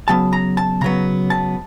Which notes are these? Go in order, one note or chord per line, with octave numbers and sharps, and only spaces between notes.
C#3 F#3 B3 A5
A#5
A5
C#3 F#3 B3 A#5
A5